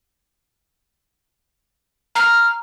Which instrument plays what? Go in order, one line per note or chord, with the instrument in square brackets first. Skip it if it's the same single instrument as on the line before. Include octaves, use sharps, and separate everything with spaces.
[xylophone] A#5 [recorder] F6